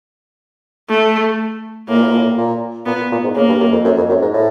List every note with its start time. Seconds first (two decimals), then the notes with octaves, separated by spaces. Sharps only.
0.89 A3
1.88 A2 A#3
1.95 A#2
2.03 A2
2.10 A#2
2.18 A2
2.38 A#2
2.86 A#2 B3
3.11 A#2
3.23 G#2
3.35 C#3 A#3
3.48 G2
3.60 F#2
3.72 F2
3.84 F#2
3.97 F2
4.09 F#2
4.22 G#2
4.34 A2